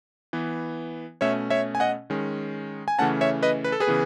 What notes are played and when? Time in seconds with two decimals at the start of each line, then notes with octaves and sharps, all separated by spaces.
0.33 E3 B3
1.21 B2 A3 C#4 C#5 E5
1.50 C#5 E5
1.75 G#5
1.80 D#5 F#5
2.10 D#3 G#3 C#4
2.88 G#5
2.99 C#3 E3 A3 C#4 F#5 A5
3.21 C#5 E5
3.43 B4 D#5
3.64 B4
3.72 A4
3.80 G#4 B4
3.87 C#3 E3 B3